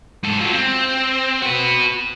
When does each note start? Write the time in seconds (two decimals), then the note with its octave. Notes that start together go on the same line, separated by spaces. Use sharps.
0.23 G#2 A4
0.41 F#3 F4
0.53 C4
1.42 F#4 B4